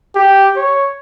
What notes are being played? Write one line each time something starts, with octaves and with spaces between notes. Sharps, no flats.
G4
C#5